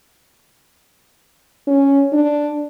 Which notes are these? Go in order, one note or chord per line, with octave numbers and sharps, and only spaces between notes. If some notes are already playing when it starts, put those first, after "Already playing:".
C#4
D4